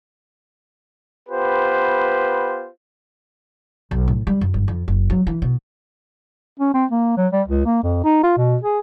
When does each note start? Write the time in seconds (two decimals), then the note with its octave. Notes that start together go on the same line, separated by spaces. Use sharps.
1.29 B3 F4 G4 B4 C5
3.91 B1
4.08 A2
4.27 G3
4.41 F#2
4.54 G1
4.68 F2
4.88 F#1
5.10 F#3
5.27 E3
5.42 B2
6.59 C#4
6.74 C4
6.91 A#3
7.17 F#3
7.33 G3
7.48 C#2
7.66 A#3
7.83 F2
8.05 D#4
8.23 F4
8.38 B2
8.62 G#4